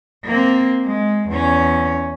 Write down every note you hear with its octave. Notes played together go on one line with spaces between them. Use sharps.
A#3 C4
G#3
E2 C#4